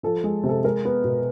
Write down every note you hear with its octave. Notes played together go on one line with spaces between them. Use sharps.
F3 A4
G#3
C3
A4
G#3 A#4
B3
B2